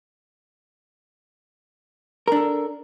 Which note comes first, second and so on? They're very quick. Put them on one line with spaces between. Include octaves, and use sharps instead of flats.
A#4 D4 A4